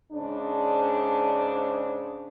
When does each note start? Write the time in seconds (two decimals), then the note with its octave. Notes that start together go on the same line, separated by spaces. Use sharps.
0.12 G#2 C#3 D4